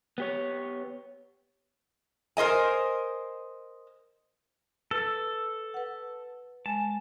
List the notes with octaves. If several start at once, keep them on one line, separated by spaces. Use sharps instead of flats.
B3 G4 C#5
A#4 C5 D#5 G#5
A4 B4
B4 F#5
G#3 G#5 A5